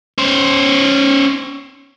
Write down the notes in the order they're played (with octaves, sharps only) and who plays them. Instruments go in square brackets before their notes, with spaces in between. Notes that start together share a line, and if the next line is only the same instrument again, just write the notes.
[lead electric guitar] C#4 C5